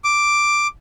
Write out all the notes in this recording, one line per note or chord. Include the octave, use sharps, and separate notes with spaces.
D6